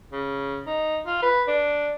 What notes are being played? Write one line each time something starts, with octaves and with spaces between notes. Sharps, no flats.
C#3
D#4
F4
B4
D4